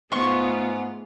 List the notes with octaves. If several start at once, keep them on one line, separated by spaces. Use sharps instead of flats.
G#2 A3 B3 F4 C6 C#6